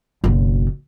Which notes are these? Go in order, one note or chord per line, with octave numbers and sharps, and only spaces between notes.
F#1 B1